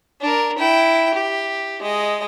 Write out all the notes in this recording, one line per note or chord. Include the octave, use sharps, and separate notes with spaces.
D4 A#4
E4 G5
G4
G#3 D#5